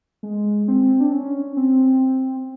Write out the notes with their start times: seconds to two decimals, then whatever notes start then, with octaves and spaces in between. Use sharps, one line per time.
0.23 G#3
0.68 C4
1.00 D4
1.13 C#4
1.57 C4